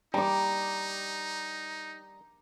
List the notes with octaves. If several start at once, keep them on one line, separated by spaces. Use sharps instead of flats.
G3 D#4 A#5 D6